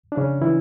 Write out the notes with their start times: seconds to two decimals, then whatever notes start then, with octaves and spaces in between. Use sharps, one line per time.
0.12 D4
0.17 C#3 C#4
0.42 E3 E4